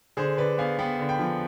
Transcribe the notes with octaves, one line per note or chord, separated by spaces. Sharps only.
D3 G#4 C5
D3 B4 D5
B3 F5 G#5
B3 G5 B5
D3
G5 B5
F3